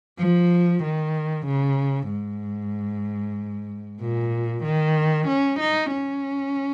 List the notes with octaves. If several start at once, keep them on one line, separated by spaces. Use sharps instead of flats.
F3
D#3
C#3
G#2
A#2
D#3
C#4
D#4
C#4